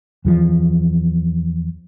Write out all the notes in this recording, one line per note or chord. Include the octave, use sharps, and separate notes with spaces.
E2 E3 F3